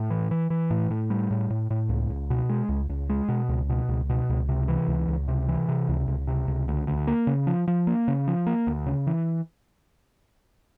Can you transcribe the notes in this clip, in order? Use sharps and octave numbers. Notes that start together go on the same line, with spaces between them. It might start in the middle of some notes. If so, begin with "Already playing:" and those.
Already playing: A2
E3
E3
E3
A2
A2
G3
A2
A2
A2
C#2
C#2
B2
G#3
C#2
C#2
G#3
B2
C#2
B2
C#2
B2
C#2
C3
E3
C#2
C#2
C3
E3
C3
C#2
C#2
C3
C#2
D2
D2
A#3
C#3
F3
F3
A#3
C#3
F3
A#3
D2
C#3
E3